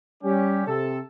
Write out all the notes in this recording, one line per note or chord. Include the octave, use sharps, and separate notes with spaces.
G3 C#4 G4
C3 A4